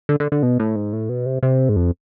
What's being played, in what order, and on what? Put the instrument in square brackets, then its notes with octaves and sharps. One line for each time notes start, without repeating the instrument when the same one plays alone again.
[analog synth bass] D3
D3
D3
B2
A2
G#2
A2
B2
C3
C3
G#2
F2